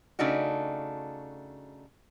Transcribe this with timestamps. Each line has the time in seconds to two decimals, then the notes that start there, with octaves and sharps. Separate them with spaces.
0.19 C#3 A3 D4 D#4 F#4